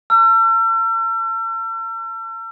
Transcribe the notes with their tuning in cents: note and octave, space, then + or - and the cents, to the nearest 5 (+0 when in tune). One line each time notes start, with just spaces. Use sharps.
A5 +40 E6 +45